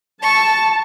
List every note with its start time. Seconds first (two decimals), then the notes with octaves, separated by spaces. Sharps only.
0.23 A5 C#6